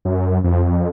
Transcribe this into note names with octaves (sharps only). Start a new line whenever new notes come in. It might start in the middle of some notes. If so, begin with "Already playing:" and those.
F#2
F2